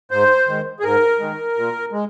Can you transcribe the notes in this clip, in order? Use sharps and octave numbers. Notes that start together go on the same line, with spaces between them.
G#2 C5
D#3 G#3
G#4
G#2 A#4
D#3 G#3
A#2
G#3